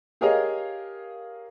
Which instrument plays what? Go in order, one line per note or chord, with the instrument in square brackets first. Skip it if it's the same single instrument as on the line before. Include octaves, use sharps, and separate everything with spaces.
[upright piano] G4 G#4 A#4 C#5 D#5 F5